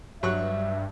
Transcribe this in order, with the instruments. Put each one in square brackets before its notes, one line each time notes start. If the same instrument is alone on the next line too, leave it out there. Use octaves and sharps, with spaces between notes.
[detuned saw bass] G2 [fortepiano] F#3 C#6 F#6 [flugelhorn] E5